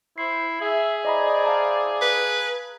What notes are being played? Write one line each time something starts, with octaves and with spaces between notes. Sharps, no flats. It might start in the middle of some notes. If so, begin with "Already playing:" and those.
E4 C5 C7
G#4 E5
E4 C5 D5 D#5 A#5 B5
F5 A5 A#5
B4